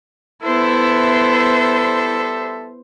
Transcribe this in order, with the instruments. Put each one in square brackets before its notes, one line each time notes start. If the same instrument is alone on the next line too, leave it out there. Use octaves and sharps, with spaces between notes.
[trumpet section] G3 A4 E5 [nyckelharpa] B3 E4 [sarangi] C5